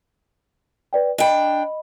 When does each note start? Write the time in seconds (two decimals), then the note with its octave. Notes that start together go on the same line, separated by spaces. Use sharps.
0.93 B4 D5 G5
1.18 D4 D#5 G5 B5